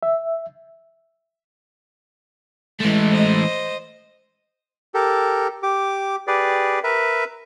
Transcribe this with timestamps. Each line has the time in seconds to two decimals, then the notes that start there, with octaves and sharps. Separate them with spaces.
0.03 E5
2.81 E3 G#3 A3
3.10 C5 D#5
4.94 G4 A4 A#4
5.63 G4 D6
6.27 G4 G#4 B4 D5
6.84 A#4 B4 E5